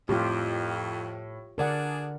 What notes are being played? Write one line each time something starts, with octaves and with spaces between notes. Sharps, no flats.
F2 A2 F4 G4
D3 D4 G#4 A#4 D5 F#5